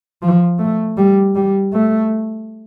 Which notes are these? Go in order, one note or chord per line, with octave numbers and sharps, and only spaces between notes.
F3
A3
G3
G3
A3